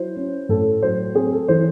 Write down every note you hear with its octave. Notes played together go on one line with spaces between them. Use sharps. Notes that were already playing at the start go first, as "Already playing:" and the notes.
Already playing: F#3 E4 C5
C#4
A2 A4
F#3 C5
C4 G#4
A4
E3 C5